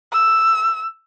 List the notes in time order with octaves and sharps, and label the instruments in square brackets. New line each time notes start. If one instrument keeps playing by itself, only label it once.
[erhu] E6